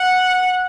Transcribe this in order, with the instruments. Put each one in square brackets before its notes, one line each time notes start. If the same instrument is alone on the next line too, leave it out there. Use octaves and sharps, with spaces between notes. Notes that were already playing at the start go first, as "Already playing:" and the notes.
Already playing: [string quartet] F#5